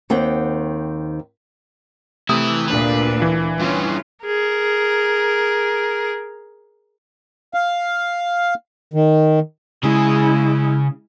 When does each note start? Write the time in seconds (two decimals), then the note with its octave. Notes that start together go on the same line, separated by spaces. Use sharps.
0.10 D#2 D#3 C4 F#5 G5
2.29 C3 E3 A3 E4 D#6
2.68 D2 A#2 D4 B4
3.22 E3
3.60 G2 C#3 C#4 F4
4.25 G#4 A#4
7.54 F5
8.94 D#3
9.83 C#3 G#3 E4 G#4